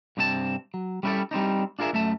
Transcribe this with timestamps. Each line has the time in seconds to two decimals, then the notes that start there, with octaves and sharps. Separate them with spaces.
0.17 G2 C3 C4 B4 A5
0.74 F#3
1.03 G3 C#4 E4 F#4 G4 A4
1.31 G3 C4 D4 D#4
1.79 D4 F4 G#4 A#4 E5
1.93 F#2 A3 E5 A5